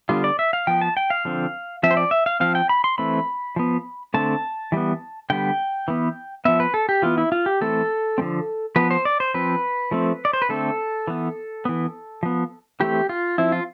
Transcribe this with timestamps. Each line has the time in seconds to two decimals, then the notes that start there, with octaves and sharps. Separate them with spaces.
0.09 D3 G3 B3 F4
0.24 D5
0.39 E5
0.53 F5
0.67 F3 B3 G5
0.81 A5
0.97 G5
1.10 F5
1.25 D3 F3 C4
1.83 F3 C4 E5
1.91 C5
1.97 D5
2.11 E5
2.26 F5
2.40 F3 C4 F5
2.55 G5
2.69 B5
2.84 C6
2.98 E3 A3 C4 B5
3.56 F3 B3
4.14 D3 A3 C4 A5
4.72 E3 G3 B3
5.30 D3 G3 B3 G5
5.88 E3 B3
6.45 F3 B3 E5
6.60 B4
6.74 A4
6.89 G4
7.02 E3 B3 F4
7.18 E4
7.32 F4
7.46 G4
7.61 E3 A3 C4 A4
8.18 D3 F3 A3 C4
8.76 F3 B3 B4
8.91 C5
9.05 D5
9.20 C5
9.34 F3 C4 B4
9.91 F3 A3 C4
10.25 D5
10.33 C5
10.42 B4
10.49 D3 A3 C4 A4
11.08 E3 B3
11.65 E3 B3
12.23 F3 B3
12.80 E3 A3 C4 G4
13.09 F4
13.38 F3 C4 E4
13.52 F4